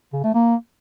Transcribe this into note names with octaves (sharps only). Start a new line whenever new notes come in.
C#3
A3
A#3